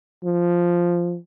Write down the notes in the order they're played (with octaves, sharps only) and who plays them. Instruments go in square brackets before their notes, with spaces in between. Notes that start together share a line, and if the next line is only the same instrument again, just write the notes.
[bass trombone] F3